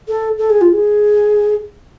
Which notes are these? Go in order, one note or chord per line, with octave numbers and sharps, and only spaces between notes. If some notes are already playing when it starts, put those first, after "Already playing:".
A4
A4
G#4
F4
G#4